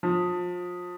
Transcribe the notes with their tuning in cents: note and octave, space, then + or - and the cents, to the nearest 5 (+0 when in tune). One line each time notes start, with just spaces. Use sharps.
F3 +30